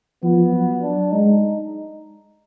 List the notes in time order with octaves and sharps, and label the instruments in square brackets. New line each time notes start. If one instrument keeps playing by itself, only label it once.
[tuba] F3 [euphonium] B3
[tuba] F#3
[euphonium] D4
[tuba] G#3 [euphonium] D#4